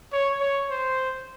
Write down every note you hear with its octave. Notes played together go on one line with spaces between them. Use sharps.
C#5
C#5
C5